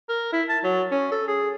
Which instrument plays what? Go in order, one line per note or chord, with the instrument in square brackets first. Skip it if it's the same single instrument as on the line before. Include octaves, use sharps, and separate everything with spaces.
[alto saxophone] A#4
E4
A5
F#3
C#4
A4
G#4